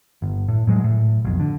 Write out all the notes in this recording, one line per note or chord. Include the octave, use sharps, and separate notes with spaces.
G1
A2
A2 F#3 G#3
A2
B1 F2
D3